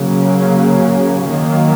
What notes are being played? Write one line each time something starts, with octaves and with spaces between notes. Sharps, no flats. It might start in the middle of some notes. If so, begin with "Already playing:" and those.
Already playing: C#3 F#3 A#3 C#4
D#3 F#3 A#3